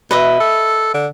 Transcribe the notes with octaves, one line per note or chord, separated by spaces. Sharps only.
B2 B4 D#5 E5
A4
D3